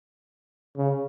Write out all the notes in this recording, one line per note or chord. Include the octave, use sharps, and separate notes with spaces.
C#3